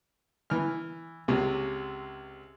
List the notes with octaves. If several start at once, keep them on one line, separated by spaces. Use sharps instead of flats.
E3 F6
C#2 C3